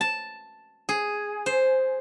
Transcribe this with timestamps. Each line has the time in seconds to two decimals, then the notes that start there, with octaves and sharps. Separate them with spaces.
0.01 A5
0.89 G#4
1.46 C5